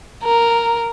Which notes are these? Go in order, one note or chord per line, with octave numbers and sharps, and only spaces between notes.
A#4